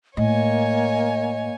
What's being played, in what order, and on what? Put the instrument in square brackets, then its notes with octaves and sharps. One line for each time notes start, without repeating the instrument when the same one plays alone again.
[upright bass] A2 [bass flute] A#3 [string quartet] C#5 G#5 [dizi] D#5